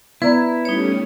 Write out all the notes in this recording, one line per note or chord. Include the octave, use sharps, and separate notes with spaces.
B3 E4 B4 D5 A#5
G3 A3 C#4 D#4 C#5